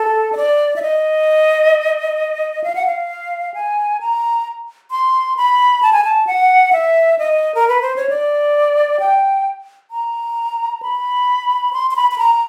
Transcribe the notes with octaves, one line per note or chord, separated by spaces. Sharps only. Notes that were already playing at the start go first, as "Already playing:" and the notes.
Already playing: A4
D#5
D5
E5
D#5
F5
F#5
F5
G#5
A#5
C6
B5
A5
G#5
A5
F#5
E5
D#5
A#4
B4
C5
C#5
D5
G5
A#5
B5
C6
C6
B5
B5
A#5